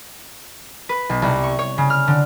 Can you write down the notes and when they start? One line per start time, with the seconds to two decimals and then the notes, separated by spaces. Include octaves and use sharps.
0.89 B4
1.09 B1
1.22 C2
1.44 C#6
1.59 C#5
1.78 C#3
1.90 F6
2.08 D3